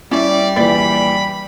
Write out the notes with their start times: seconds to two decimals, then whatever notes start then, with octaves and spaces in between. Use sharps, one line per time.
0.11 G3 C#4 E4 D5 E5
0.56 A#1 E3 D5 B5